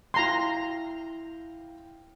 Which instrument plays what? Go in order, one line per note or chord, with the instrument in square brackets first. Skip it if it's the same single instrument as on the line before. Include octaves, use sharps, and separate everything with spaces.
[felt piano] E4 F5 G5 [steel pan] A#5 C6